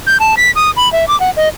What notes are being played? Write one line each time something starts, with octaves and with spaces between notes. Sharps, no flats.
G6
A5
B6
D#6
B5
E5
D6
F#5
D#5